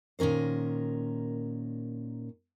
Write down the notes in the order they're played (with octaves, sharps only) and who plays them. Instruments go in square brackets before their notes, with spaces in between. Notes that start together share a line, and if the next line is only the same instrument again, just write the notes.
[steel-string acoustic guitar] A#2 D#3 C#4 A#4 C5